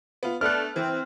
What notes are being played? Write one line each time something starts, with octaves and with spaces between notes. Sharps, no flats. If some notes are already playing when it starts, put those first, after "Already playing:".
B3 F4
A3 B3 D4 F6 F#6
E3 C4